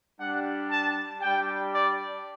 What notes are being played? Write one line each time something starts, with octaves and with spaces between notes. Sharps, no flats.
G3 D4 G4 F#5
A5
G3 D4 G4 G5
D5